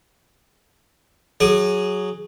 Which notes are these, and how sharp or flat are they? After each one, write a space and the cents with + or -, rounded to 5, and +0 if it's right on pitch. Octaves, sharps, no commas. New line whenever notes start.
F#3 +0 G#4 +0 D6 +45